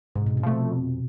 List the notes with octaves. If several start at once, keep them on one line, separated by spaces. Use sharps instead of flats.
G#2 C3
B2
C3
F3 A3
F2